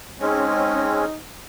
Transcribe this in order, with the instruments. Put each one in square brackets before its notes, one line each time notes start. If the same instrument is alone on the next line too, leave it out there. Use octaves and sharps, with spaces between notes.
[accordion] G#3 C4 C#4 [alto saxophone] D#4